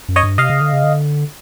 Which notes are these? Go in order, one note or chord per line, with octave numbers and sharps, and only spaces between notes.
F#2
C#5 D#5
G2
C3 D#5 F5
C#3
D3
C#3
D3